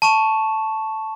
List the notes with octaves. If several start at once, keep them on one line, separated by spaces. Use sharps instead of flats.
A5 C#6 E7